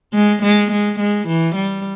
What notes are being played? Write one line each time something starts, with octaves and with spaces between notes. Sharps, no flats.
G#3
G#3
G#3
G#3
E3
G3